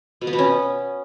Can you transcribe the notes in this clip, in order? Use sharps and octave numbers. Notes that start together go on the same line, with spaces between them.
B2
B3
B2
C#4